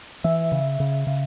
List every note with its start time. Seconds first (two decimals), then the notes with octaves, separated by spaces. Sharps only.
0.24 E3 E5
0.52 C#3
0.80 C#3
1.07 C#3